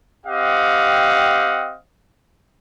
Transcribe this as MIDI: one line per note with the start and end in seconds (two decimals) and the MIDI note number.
0.25 1.75 60
0.25 1.75 67
0.25 1.75 75
0.25 1.75 77
0.25 1.75 78